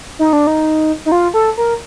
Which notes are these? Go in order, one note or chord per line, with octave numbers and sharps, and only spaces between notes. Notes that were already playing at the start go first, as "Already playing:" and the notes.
D#4
D4
D#4
D#4
F4
A4
A#4